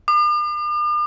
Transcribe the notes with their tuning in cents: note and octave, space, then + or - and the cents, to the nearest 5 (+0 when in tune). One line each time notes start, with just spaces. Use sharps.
D6 +45